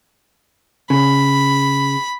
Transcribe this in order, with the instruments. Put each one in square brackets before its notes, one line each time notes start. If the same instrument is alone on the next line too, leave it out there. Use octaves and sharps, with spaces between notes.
[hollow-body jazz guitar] C#3 [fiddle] B5